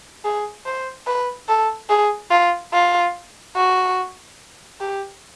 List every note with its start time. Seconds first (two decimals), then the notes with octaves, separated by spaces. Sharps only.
0.24 G#4
0.65 C5
1.07 B4
1.48 A4
1.89 G#4
2.31 F4
2.73 F4
3.56 F#4
4.80 G4